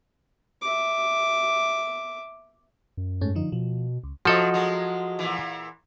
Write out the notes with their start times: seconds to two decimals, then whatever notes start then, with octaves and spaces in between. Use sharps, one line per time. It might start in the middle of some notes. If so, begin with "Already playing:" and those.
0.62 E5 D6
2.97 F#2
3.21 G#2 A3 C#4
3.35 D3 F3 D#4
3.52 B2 F3
4.04 C#2
4.25 C3 F3 F#3 F#4 A4 D#5
4.54 F#3 G#3
5.19 A#2 E3